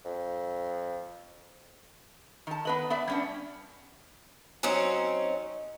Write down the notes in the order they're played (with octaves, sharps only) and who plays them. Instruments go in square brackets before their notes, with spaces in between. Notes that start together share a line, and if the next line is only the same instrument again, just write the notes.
[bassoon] F2
[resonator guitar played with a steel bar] D#3 A5
B3 B4 D#5
B3 D5 E5
G3 C#4 D4
[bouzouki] F#3 C4 C#4 D#4